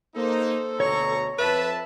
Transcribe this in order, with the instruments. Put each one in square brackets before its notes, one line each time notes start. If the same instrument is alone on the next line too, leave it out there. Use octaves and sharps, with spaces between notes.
[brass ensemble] A#3 D#4 [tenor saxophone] A4 [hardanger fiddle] C5
[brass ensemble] D2 B2 A#5 [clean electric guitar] C#5 [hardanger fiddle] C#6
[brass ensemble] F2 A5 [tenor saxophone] B4 [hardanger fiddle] E5